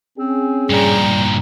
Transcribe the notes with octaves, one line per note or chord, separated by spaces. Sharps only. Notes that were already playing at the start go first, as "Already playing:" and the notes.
C4 C#4 G#4
G2 A#2 G3 G5 A#5